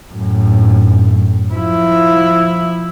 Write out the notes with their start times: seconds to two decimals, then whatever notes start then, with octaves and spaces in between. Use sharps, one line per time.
0.12 F#2 A2
1.53 F3 E4